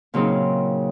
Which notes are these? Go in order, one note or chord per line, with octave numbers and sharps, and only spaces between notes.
A#2 C#3 F#3 C4 D#4 G#4